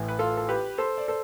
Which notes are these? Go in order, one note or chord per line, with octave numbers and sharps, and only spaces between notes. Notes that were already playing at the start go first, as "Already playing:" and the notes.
Already playing: A1 A2 E3
B4
F4 A4
A4
G4 B4
A4 C5
D5
A4 C5